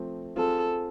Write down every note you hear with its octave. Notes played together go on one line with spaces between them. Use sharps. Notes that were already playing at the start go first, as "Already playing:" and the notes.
Already playing: F3 A3 C4
C4 F4 G#4 A4